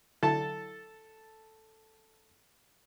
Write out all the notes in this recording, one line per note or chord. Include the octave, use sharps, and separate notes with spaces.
D3 F#3 E4 A4 A5